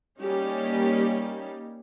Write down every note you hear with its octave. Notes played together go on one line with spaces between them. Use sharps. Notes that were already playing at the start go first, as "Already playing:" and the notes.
G3 A#3 C#4 D#4 G4